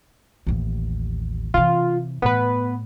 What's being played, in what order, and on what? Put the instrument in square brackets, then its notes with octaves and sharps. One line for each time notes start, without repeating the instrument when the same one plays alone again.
[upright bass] A1 D#2
[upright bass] C3 E3 [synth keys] F4
[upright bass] A2 [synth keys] B3 B4